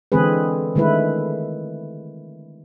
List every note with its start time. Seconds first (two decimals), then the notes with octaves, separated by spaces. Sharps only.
0.12 D3 E3 G#3 C4 G#4 B4
0.75 D3 D#3 G#3 A3 E4 B4